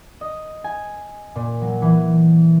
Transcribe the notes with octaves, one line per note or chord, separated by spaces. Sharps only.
D#5
G#5
A#2
F#3
E3